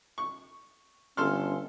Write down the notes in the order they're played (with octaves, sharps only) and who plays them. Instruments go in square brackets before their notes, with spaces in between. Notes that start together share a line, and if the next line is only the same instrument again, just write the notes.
[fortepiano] C#6
[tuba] G1 [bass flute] C#4 [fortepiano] A4 C6 F6